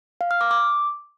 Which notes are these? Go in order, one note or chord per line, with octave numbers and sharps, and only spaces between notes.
F5
F6
D6
D6